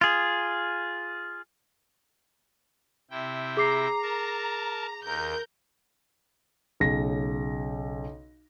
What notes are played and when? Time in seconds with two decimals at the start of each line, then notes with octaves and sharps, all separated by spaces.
0.01 F4 G#4
3.11 C3 E4 G5
3.57 G#4 A#5 D6 C7
4.02 A#4 A5
5.04 D#2 A#4 G6
6.80 B1 C#3 A#6